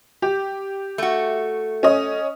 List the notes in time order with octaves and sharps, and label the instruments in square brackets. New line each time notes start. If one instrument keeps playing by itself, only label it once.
[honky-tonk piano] G4
[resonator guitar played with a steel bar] A3 F#4
[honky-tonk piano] C#4 D#5